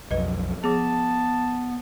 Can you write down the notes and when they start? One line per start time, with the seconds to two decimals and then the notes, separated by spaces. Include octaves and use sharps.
0.11 B1 F2 F#3 B4 D#5
0.64 F3 B3 G#4 A5